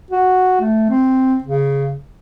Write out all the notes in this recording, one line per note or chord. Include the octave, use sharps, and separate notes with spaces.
F#4
A3
C4
C#3